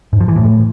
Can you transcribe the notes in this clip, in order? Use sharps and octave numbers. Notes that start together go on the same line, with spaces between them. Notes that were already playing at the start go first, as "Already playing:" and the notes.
G#2
F3
E3
A2